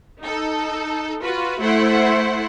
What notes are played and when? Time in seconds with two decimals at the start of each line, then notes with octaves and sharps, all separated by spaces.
0.22 D#4 A4
1.22 F4 F#4 B4
1.61 A3 E4 C5 F#5